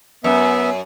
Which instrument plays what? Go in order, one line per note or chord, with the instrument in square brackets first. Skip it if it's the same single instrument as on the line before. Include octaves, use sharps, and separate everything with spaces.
[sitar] F#2 [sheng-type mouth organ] B3 E5